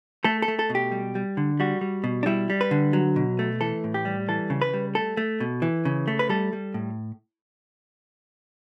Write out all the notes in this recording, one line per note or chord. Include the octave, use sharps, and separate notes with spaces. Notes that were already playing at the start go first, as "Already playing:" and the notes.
A3 A4
A4
A3
A4
B2
G4
G3
G3
D3
G3 F#4
G3
B2
D4
G3 E4
G3
B4
D3
F#3
B2
A3
E3 A4
A2
G4
G3
E3 A4
C#3
B4
G3
A3 A4
A3
B2
E3
C#3
A3
B4
G3 A4
G3
A2